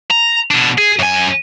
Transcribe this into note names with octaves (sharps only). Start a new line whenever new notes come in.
A#5
B2 D4
G#4
F#2 G#5